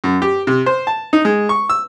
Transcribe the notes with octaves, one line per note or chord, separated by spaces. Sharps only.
F#2
G4
C3
C5
A5
D#4
G#3
C#6
E6